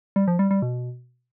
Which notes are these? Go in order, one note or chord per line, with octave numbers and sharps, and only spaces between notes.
G3
F3
G3
G3
B2